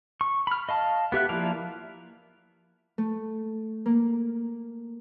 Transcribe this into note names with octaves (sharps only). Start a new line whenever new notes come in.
C#6
B5 F6
D#5 F5 A5
B3 G4 E5 F#6
F3 A#3 E4 D5 F5
A3
A#3